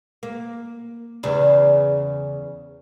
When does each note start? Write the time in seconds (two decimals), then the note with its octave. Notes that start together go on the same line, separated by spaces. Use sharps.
0.23 A#3
1.23 E2 C#3